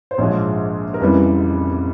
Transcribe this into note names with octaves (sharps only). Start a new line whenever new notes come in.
C5
A#1 G#2 F3 G#3 C#5
A#4
F1 F2 C#3 E3 G3 B4